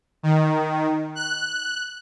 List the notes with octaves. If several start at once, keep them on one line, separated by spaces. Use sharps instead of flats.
D#3
F#6